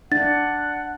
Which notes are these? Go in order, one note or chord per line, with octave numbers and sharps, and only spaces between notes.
D4 F#5 A6